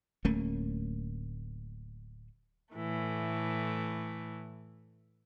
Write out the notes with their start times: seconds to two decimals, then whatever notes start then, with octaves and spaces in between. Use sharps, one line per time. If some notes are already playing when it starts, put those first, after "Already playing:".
0.25 D1 A3 A#3 C#4
2.73 A2 E3 A3